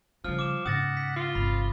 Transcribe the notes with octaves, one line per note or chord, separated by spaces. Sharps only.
C#3 F3 G3 F6
D6 E7
G#2 C#3 F#5 D#6 A6 A#6
B6
F4 C7
G1 C3 B5